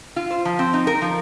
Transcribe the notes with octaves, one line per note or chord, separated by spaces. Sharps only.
F4
C5
F3
C4
D#4
A#4
F3